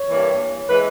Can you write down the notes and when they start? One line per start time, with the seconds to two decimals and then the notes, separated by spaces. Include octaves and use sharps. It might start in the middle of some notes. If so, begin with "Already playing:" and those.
Already playing: C#5
0.10 G2 E3 G3 A#3
0.70 E3 G#3 B4